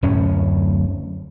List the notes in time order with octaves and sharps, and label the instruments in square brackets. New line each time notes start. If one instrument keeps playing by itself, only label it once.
[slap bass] D1 F#2 A2 C#4